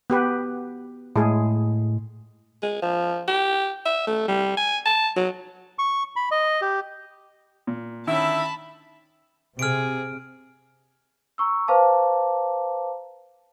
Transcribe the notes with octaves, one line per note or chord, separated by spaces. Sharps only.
B3 G4 B4
A2 G#3 G#4
G#3
F3
G4
E5
A3
G3
G#5
A5
F#3
C#6
B5
D#5
G4
A#2
D3 D#3 C#4 E4 E5 A5 B5
C3 G#4 F6 D7
A#5 C#6 E6
B4 C5 F5 A5 A#5 D6